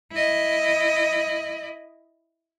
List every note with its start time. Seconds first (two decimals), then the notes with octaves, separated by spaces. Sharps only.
0.11 E4 D#5